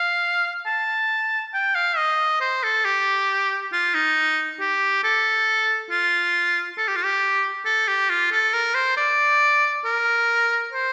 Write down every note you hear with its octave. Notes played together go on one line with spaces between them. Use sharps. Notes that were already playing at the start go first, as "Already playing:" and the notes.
Already playing: F5
A5
G5
F5
D#5
C5
A4
G4
F4
D#4
G4
A4
F4
A4
G4
F4
G4
A4
G4
F4
A4
A#4
C5
D5
A#4
C5